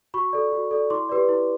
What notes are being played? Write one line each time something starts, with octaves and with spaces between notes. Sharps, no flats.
F#4 B5 C#6
A4 D5
F#4
A4 D5
E4 C6 D6
G4 B4 D5
E4